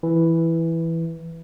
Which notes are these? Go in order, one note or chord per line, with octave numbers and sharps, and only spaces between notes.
E3